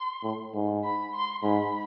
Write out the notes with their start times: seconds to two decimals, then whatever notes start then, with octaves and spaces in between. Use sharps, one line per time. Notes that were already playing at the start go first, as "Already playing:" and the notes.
Already playing: C6
0.23 A2
0.54 G#2
0.84 B5
1.14 C6
1.43 G#2 B5